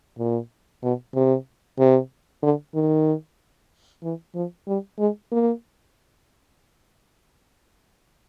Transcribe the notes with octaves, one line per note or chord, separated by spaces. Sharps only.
A#2
B2
C3
C3
D3
D#3
E3
F3
G3
G#3
A#3